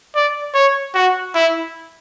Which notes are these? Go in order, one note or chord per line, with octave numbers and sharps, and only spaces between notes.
D5
C#5
F#4
E4